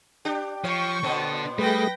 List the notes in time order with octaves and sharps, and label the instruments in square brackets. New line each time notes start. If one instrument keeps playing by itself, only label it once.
[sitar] D4 G4
[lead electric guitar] F3 [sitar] C#5 [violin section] G5 C#6
[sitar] A#2 B3 C4 [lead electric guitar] D4 A4
[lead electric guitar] G3 [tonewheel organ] A3 G#4 [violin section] B4 G5 A#6